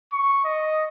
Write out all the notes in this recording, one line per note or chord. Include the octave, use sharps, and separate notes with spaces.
C#6
D#5